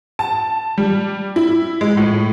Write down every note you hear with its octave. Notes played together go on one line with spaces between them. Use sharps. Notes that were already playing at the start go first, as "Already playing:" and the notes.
A5
G3
E4
G#3
A2